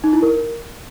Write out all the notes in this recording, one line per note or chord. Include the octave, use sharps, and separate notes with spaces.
D#4
E4
A#4